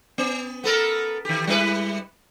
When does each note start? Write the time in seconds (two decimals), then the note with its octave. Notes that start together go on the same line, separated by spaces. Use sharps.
0.18 B3
0.64 B3 A4 A#4
1.25 D#3 G4
1.47 G3 E4 B4